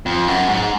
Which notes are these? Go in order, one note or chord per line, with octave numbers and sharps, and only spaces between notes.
F2
F#2
G#2